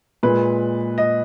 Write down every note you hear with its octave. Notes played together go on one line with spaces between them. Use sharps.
A#2 G#3 B4
D#5